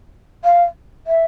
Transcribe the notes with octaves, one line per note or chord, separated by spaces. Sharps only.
F5
E5